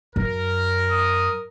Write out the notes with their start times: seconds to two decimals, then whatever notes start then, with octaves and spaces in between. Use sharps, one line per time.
0.16 F#2 A#4
0.91 D#6